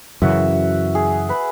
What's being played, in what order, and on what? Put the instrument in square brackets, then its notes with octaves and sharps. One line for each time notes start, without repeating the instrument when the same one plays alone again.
[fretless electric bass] F#2 C#3 E3 [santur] F#4 E5
[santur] G#4
B4